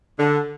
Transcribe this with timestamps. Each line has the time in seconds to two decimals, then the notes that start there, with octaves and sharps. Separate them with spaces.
0.19 D3